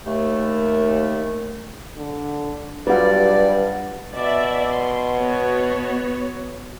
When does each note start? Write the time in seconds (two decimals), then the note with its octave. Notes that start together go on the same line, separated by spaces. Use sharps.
0.05 D#2 A3
1.98 D3
2.87 G2 F#3 G3 F4 B4 D5 F#5
4.15 B2 D5 E5
4.72 C6
5.16 B3 F#4 C#5